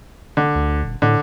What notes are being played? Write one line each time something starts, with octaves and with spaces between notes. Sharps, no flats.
D3
D2
D#1
A2 D3